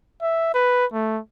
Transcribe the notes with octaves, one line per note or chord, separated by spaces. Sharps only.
E5
B4
A3